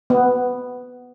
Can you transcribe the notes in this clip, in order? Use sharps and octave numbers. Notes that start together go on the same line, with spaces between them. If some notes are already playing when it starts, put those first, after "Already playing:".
B3